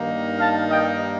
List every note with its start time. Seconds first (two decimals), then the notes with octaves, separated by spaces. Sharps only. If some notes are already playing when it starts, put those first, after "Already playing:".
Already playing: G2 D#3 A#3 D#4
0.39 F5 A5
0.69 D#5 G5